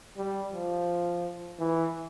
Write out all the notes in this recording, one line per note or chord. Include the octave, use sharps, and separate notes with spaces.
G3
F3
E3